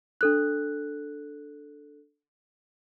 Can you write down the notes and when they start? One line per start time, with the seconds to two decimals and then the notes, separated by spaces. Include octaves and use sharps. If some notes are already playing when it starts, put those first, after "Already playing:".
0.21 D4 A4 F#6